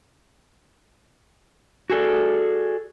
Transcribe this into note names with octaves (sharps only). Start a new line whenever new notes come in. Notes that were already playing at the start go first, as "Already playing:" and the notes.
F#4 G#4 A4 D5